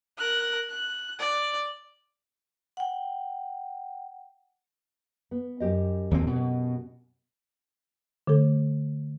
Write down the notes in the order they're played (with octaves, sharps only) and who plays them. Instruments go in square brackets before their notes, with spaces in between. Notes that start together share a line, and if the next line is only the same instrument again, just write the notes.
[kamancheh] A#4 F#6
F#6
D5
[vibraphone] F#5 G5
[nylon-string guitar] B3
F#2 G4 D#5
[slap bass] D#2 A#3 C4
B2
[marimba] D3 A3 A4